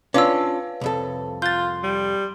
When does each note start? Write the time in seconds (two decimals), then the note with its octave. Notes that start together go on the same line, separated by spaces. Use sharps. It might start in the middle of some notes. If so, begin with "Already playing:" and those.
0.14 C#4 D4 F4 B4 C#5 F5 D6 E6
0.81 C2 F2 A4
1.42 F4 C6 G6 A6
1.83 G3